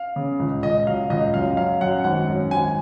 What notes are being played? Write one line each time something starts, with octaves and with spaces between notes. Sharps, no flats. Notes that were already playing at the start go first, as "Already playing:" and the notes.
Already playing: F5
C#3
C#2
C#2 D#5
F#3 F5
C#2 D#5
F#2 F5
F#3 F5
F#2 F#5
G#1 F#5
F#2
G#1 G#5